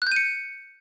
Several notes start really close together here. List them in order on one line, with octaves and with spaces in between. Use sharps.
F#6 G6 D#7 C#7